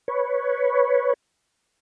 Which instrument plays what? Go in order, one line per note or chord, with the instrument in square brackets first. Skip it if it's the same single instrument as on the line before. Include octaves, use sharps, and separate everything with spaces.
[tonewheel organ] B4 C#5